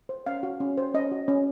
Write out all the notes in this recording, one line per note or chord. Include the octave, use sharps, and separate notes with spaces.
C5
C#4 F5
F#4
C#4
C5
C#4 D#5
F#4
C#4